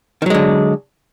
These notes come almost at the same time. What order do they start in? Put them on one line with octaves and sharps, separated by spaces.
D#3 F#3 G#3 D3